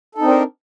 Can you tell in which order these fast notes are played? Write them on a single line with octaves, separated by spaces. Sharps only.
A4 D#4 C4 D4 A#4